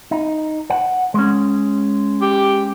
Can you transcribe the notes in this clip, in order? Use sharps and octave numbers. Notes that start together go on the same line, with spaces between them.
D#4
F#5
G#3 C#4
G4